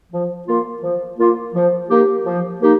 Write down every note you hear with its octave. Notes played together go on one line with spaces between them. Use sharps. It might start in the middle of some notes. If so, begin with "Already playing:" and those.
F3
A#3 F4
F3
A#3 F4
F3
A#3 D#4 G4
F3
A#3 D#4 G4